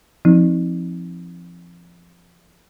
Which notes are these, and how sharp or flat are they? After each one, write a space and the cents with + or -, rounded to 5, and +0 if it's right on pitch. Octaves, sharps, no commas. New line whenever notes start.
F3 -15 C4 +0 D#4 +35